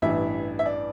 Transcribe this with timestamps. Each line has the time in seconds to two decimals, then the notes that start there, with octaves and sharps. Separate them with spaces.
0.02 A1 G2 E3 E5
0.59 E5
0.66 D5